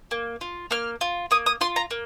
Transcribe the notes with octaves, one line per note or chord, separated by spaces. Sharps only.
A#3
F4
A#3 F6
F4
A#3 D#6
D#6
F4 C6
A#5
A#3